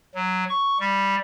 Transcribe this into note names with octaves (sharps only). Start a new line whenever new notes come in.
F#3
C#6
G3